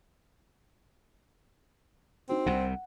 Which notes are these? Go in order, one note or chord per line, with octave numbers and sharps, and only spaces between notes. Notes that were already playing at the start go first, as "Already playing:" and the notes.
C4 D#4 F#4
C2 C3 F#5